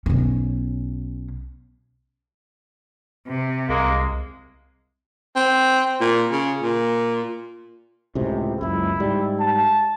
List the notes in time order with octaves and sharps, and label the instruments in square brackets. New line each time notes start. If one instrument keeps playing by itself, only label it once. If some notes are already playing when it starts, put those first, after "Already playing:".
[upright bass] B1 C#4
[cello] C3
[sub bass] C2 [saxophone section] G#3 A#3
[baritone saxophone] C4
A#2
C#3
A#2
[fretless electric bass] C#2 A2 C3
[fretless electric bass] F#1 C#2 [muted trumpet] E4
[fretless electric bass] G#2 G3
[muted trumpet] A5